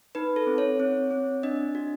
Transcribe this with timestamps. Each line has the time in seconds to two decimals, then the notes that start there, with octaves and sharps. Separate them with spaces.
0.15 D#4 B4
0.36 A4
0.47 C4
0.58 C#5
0.80 C4
1.11 C4
1.43 D4 D#5
1.75 F#4